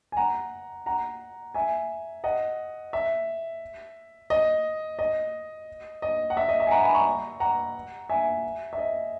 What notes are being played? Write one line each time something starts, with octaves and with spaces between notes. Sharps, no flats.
G#5
F#5 A#5
F#5 A#5
E5 G#5
D#5 F#5
E5
D#5
D#5
D#5
F#5
E5
D#5
E5
G#5
F#5 A#5
G#5 B5
A#5 C#6
F#5 A#5
E5 G#5
E5
D#5